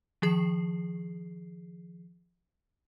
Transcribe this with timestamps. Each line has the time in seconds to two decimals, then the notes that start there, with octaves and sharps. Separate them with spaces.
0.22 D#3 F3 G#4 C7